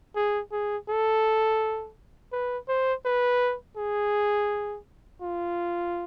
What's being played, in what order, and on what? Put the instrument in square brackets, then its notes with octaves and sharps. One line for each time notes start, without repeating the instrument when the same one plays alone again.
[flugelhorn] G#4
G#4
A4
B4
C5
B4
G#4
F4